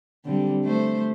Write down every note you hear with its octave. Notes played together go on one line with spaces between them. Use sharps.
D3 G3 C4
A3 C5